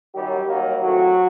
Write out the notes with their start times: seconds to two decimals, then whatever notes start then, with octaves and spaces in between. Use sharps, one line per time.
0.13 F#2 D#3 F#3 G3 G4
0.48 D#2 D#3 F#3 G3 A#3 F#4
0.82 A2 F#3 A3 C4 F#4